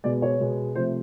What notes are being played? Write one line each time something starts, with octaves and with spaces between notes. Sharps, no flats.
B2 G#3 B3 D5
C#5
B2 G#3 B3
C3 F3 A3 C5